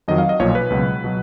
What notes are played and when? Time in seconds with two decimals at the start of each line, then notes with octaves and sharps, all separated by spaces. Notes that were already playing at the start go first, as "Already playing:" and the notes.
0.08 F2 D#3 F#3 D#5
0.18 F5
0.29 D#5
0.39 B1 A#2 F3 C#5
0.55 B4
0.70 C#2 B2 F#3
1.04 B2 F#3